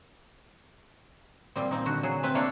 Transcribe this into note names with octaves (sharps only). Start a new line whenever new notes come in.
A#2 G3 C4
A#2 C4 D#4
D3 F#4
F#3 G#4
C3 C4 B4
A#3 D4 E4 C#5 D5 F5